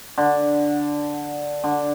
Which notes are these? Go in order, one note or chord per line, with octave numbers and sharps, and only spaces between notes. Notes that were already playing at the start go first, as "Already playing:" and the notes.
D3
D3